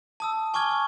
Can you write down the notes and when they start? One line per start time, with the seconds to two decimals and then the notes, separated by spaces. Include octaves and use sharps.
0.20 A5 D#6 E6
0.54 G#5 C#6 D6 F6 G#6 G7